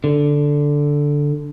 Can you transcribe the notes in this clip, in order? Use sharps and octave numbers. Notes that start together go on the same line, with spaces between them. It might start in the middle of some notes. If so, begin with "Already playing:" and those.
D3